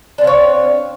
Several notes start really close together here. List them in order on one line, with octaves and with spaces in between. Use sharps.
D4 C4 F5 C#5